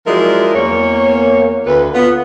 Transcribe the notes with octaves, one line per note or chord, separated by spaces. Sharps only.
F3 F#3 G#3 E4 A#4 D5
E2 A#3 C#5
D2 D3 B4
B3 F4